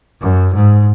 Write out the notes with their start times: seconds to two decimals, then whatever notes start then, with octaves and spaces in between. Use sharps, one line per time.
0.21 F#2
0.54 G#2